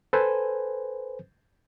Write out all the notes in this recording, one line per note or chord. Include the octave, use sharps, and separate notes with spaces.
A4 B4 C5 G#5